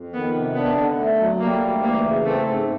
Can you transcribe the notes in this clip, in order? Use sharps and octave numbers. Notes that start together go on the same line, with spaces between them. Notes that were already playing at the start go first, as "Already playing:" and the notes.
Already playing: F2
D#3 B3
C3
B3 D4
D3
A3
F#3
G3 A#3
D2
E3 A#3
C#3
A3 C4
G#2